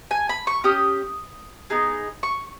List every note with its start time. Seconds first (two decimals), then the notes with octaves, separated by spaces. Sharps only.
0.11 G#5
0.29 B5
0.47 C#6
0.64 C#4 G4 D#6
1.70 B3 D#4 G#4
2.23 C#6